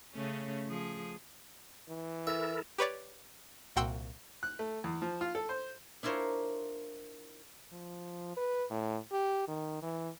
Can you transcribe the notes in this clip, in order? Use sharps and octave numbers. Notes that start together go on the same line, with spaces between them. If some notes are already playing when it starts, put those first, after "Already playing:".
C#3 A3 C#4
F3 G#4
E3
E4 A4 A#4 E5
G4 B4 C#5 D5
C2 A#2 F#4 G5 C6 E6
F#6
A3
E2
F3
F4
A4
C5
D4 E4 F4 A#4 C5 C#5
F3
B4
A2
G4
D#3
E3